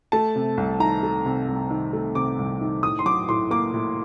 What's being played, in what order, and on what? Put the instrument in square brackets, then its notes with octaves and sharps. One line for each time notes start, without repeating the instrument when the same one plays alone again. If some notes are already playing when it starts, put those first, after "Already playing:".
[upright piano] A3 A5
C3
C2
D#3 A#5
A3
C3
C2
D#3
A3
C3 D6
C2
D#3
A2 D#6
C6
F#3 D6
A2 C6
A#3 D6
A2